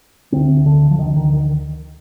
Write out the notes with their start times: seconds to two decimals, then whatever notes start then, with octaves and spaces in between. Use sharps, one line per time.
0.32 D2 D3 C4
0.66 D3
0.90 F3
0.99 D2 D3 D#3
1.16 D#3
1.33 D#3